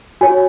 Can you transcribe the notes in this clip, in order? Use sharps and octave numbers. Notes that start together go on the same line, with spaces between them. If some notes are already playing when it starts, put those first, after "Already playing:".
F#4 C#5 G#5